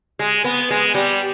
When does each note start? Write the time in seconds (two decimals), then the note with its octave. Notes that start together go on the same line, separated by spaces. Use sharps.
0.19 G#3
0.44 B3
0.70 G#3
0.94 G3